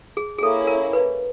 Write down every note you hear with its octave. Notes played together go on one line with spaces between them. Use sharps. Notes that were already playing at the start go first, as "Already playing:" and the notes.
G#4
G#4
A#3 C#4 E4 A4
A#4
B4